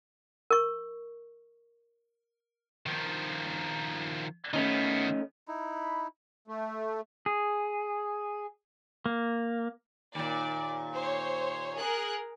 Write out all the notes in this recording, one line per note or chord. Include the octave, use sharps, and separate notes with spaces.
A#4 C#6
D#3 F3
D#3 A3 B3 C#4 D#4
D#4 E4 B5
A3
G#4
A#3
D#2 A#2 D5
C5 C#5
G#4 A#4 F#6